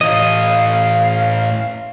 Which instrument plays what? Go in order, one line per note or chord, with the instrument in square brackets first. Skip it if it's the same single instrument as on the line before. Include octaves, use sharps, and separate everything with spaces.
[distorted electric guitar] A2 E3 [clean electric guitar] D#5 [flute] F5